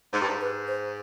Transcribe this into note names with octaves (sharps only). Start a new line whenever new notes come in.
G#2
G2
G#2
B4
C5